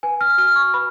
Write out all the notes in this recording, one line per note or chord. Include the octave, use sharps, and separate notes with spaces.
B4 G#5
F6
F#4 F6
C#6
B4 B5